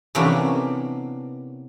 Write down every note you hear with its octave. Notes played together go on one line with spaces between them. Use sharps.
C3 E3 A#3 B3 C#4 D4